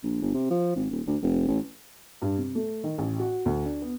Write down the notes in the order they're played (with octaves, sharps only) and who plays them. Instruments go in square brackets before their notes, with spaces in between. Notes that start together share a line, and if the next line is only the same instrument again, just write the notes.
[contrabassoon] A#1
G1
C3
F3
G#1
D#1
D2
F1
A1
[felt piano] G2
C3
A3
D#3
A1
F#4
D2
D4
B3